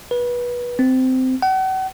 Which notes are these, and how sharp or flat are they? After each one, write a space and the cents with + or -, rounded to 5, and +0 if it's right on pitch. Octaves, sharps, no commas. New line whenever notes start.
B4 -25
C4 -20
F#5 +40